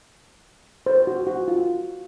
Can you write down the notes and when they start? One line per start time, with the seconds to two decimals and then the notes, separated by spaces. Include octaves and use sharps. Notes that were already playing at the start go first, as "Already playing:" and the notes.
0.86 C5
1.07 F#4
1.27 F#4
1.48 F4